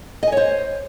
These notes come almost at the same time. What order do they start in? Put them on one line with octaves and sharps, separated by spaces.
D#5 G#5 C#5 C5